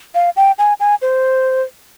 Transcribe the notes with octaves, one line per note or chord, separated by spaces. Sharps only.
F5
G5
G#5
G#5
C5